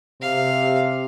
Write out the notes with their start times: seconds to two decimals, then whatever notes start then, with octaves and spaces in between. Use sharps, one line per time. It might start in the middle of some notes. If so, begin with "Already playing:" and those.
0.22 C3 F5